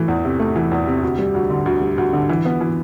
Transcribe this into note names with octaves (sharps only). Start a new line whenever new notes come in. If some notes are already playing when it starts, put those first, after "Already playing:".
Already playing: E3 A3
E2
C3
A3
E3
E2
C3
D2
G3
D2
D3
D2
G3
D2
D3
E3
B3
E3